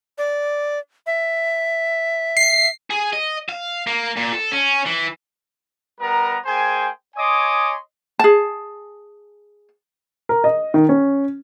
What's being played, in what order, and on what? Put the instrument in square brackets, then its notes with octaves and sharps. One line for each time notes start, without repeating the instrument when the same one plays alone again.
[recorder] D5
E5
[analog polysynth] C7
[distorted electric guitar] G#4
D#5
F5
A#3
A#2
A4
C#4
E3
[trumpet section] G3 B3 A#4 A#5
A#3 G#4 C5 G5 G#5
C#5 D#5 G#5 C6 D6 D#6
[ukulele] G#4 A5
[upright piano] A#4
D#5
D#3
C#4